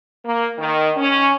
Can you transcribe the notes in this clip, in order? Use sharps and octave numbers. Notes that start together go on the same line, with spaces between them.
A#3
D#3
C#4